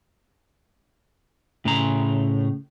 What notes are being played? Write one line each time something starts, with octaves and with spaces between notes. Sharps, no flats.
A2 C#3 A#5